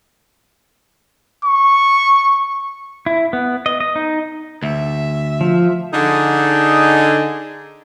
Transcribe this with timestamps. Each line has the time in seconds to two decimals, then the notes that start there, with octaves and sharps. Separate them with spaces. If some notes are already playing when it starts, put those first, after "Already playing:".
1.45 C#6
3.06 E4
3.33 B3
3.66 D#5
3.80 D#5
3.96 D#4
4.63 D2 E5
5.41 F3
5.94 D3 D#4 G#4